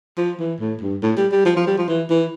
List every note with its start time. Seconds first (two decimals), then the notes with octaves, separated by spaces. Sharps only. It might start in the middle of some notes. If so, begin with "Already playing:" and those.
0.18 F3
0.39 E3
0.60 A2
0.81 G2
1.02 A2
1.17 G3
1.32 G3
1.45 F3
1.56 F3
1.67 G3
1.78 F3
1.88 E3
2.10 E3